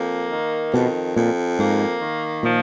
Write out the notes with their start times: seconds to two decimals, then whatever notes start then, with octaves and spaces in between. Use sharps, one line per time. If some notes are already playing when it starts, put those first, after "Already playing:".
Already playing: F2 A#3
0.32 D#3
0.74 F2 B2
1.16 F2 A#2
1.58 G#2 A#3
2.02 D#3
2.43 A#2 F3